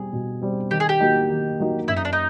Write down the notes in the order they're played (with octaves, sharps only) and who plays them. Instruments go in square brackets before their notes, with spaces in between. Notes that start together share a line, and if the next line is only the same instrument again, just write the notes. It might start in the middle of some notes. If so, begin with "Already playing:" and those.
Already playing: [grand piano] B2 G3 C4 [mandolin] G#4
[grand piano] B2
G3 C4
[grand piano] D#3 [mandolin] G4
[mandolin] G#4
G4
[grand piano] F#3 A#3 D#4
D#3
F#3 A#3 D#4
[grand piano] F#2 [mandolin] E4
[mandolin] D#4
D4
D#4